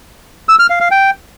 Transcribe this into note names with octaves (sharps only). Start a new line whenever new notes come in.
E6
F6
F5
F5
G5